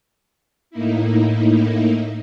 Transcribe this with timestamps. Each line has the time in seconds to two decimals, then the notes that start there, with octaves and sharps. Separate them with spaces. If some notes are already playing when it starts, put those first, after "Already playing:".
0.70 A2 A#3 D#4 E4